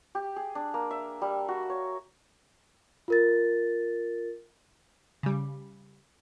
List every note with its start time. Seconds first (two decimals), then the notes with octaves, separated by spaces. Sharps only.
0.15 G4
0.36 G#4
0.55 D4
0.74 A#3
0.91 E5
1.21 G3
1.48 F#4
1.70 C#5
3.08 F4 A#4 A6
5.23 C#3 G3